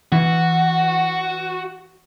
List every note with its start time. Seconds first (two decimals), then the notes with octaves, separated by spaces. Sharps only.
0.12 E3 F#4